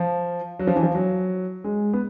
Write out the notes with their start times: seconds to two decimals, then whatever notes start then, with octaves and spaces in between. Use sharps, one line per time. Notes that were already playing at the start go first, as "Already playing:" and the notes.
Already playing: F3
0.59 F#3
0.67 F3
0.76 E3
0.83 F3
0.95 F#3
1.64 G#3
1.93 B3